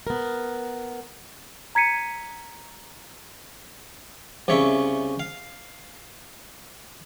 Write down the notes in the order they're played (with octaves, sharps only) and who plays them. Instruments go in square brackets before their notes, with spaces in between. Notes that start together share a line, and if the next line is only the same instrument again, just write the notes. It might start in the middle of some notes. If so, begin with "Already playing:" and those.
[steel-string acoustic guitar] B3 A#4
[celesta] A#5 G#6 B6 C#7 D#7
[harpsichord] C2 C#3 C#5 E5
F5